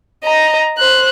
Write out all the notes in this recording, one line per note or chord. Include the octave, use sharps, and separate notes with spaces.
D#5 A#5
C5 F#6